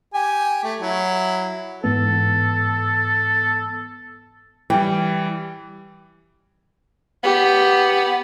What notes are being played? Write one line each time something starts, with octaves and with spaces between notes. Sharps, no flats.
G4 G#5
A3
F#3 E4
G#2 E3 B3 A4
E3 G3 G5
B3 G4